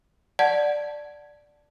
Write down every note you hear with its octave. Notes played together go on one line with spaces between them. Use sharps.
D5 F#5 A5 G#6